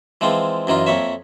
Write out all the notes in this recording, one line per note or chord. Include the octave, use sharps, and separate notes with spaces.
E3 F3 G#3 C4 F4
F#2 E3 D#4 F4
F2 A#3 C#5 E5